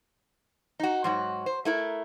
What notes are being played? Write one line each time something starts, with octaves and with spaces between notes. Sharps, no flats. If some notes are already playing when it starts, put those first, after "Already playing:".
D#4 F#4
G#2 F#3 F#4
C5
A3 E4 A#4